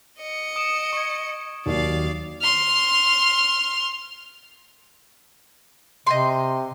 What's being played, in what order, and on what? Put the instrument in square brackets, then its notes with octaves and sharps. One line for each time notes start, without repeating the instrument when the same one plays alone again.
[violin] D#5 C#7
[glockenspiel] D#6 D7 E7
C#6 G#6
[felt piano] D#2 D#3 F#3 [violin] D5 F5
[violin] C6 F6
[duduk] C3 [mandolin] D#5 G5 C6